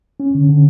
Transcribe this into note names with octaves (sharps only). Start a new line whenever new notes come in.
C#4
D3
D3